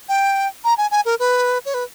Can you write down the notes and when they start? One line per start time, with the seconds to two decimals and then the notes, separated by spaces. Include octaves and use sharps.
0.09 G5
0.64 A#5
0.78 G#5
0.91 G#5
1.05 A#4
1.19 B4
1.65 C#5
1.74 B4